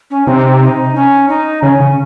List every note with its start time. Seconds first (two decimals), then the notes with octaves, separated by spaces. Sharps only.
0.10 C#4
0.27 C3 D#4
0.62 D#4
0.95 C#4
1.29 D#4
1.63 C#3 C#4
1.80 C#3